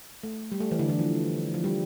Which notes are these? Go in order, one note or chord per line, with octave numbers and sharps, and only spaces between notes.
A3
G3
A3
E3
D3
E3
F3
F3
G3